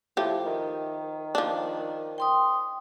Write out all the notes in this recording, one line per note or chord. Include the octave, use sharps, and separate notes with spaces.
A2 F3 G4
D#3
F3 D4
G5 C6 D#6